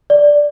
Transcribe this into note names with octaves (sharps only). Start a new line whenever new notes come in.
D5